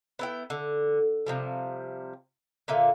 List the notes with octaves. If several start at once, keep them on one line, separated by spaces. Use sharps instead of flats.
B3 E4 G5
D3
C3 F3 G3
A#2 D3 F4 E5